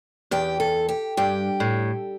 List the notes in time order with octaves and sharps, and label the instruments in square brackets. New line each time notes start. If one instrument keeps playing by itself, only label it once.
[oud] E2 [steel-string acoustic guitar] G4
[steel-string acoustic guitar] A4
G4
[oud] G2 [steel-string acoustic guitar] G4
[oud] A2